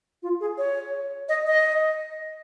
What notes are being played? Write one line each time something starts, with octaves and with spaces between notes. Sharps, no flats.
F4
G#4
C#5
D#5
D#5